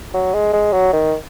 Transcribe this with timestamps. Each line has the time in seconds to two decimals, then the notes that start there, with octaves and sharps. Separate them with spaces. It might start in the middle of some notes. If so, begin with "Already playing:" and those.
0.14 F#3
0.34 G#3
0.53 G#3
0.73 F#3
0.93 D#3